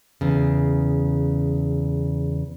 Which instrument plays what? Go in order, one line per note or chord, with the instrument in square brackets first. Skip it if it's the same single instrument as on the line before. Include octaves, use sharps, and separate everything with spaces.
[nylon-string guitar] E2 C#3